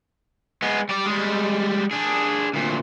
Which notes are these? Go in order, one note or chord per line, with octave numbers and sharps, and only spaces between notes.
G#3 B3
G3 D5
G3 G#3
D4 G#4
D2 A#2